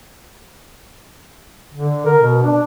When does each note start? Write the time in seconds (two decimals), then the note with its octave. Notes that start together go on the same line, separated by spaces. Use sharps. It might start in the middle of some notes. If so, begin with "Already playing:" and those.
1.74 D3
2.06 A#4
2.22 B2
2.43 D4